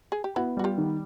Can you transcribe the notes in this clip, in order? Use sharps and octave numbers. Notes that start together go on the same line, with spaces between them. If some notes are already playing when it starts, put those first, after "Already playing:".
G#4
G4
B3 E4 F#4
G3 F#4
F4 G4
D#3